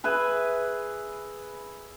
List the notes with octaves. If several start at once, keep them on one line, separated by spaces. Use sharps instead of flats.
G#4 B4 E5 G#5